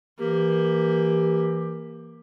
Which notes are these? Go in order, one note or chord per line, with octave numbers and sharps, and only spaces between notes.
E3 A#3 G4